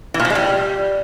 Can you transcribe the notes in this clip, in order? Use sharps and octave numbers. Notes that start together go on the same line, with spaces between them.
E3
A#2
F3
G#3
G3